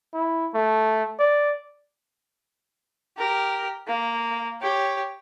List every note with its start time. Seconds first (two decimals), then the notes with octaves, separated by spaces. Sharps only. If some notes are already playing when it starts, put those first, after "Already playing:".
0.14 E4
0.54 A3
1.19 D5
3.17 G4 A#4
3.87 A#3
4.62 G4 C#5